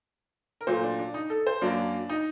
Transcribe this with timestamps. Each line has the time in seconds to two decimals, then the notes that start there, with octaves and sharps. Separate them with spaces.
0.61 A#4
0.67 A#2 F#3 A3 C5
0.83 D4
0.99 D4
1.14 D#4
1.30 A4
1.47 C5
1.62 F#2 F#3 A#3 D4
2.09 D#4